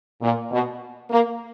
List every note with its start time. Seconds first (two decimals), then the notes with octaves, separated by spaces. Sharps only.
0.22 A#2
0.52 B2
1.10 A#3